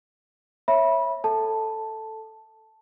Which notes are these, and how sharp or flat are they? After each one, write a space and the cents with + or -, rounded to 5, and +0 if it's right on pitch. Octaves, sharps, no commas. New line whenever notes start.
C#5 -20 E5 +0 B5 -20
A4 +5 A5 +0